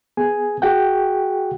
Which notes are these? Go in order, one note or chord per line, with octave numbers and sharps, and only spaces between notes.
B3 G#4 G#5
F#4 G#4 F#5 G5